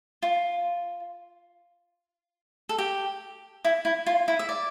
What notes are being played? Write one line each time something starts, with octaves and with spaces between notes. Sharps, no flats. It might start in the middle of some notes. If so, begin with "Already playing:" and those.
F4
A4
G4
E4
E4
F4
E4
E5
D5